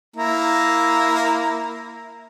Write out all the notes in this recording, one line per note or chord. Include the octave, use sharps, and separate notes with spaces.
A#3 E4 A#5